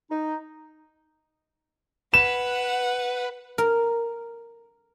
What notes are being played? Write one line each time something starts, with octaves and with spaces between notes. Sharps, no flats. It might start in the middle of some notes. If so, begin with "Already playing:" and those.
D#4
B4 F#5 E7
A#4